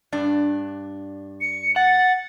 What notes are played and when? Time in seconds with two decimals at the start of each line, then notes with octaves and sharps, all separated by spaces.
0.12 G2 D4
1.41 C#7
1.76 F#5 A6